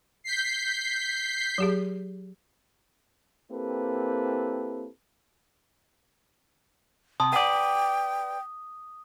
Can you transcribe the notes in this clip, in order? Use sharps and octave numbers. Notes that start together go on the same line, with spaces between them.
G6 B6 C7
F#3 G4 G#4
A#3 C4 E4 G4 A4 B4
C3 A5 C6 D#6
B4 D5 F#5 G5